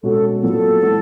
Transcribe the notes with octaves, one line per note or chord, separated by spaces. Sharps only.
B2 G#3 C#4 F#4 A4
A#2 F#3 B3 A4
E3 G#3 B3